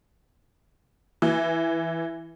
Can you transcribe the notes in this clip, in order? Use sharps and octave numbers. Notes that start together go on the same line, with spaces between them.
E3